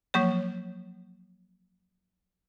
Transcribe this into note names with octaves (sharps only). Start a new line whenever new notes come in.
F3 F#3 A#3 C#5